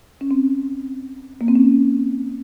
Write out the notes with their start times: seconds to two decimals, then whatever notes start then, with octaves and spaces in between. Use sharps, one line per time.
0.21 C#4
0.31 C4
1.41 A#3
1.48 C4
1.55 C#4